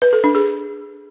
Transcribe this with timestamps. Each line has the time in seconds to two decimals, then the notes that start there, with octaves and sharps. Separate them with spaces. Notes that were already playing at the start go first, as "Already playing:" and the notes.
0.02 B4
0.13 A4
0.24 D4
0.35 G#4